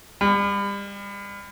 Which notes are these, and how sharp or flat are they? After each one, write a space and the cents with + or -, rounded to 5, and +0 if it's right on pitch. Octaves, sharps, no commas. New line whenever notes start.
G3 +35